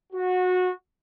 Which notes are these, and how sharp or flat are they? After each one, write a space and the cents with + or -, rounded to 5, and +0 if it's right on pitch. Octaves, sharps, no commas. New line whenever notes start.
F#4 -20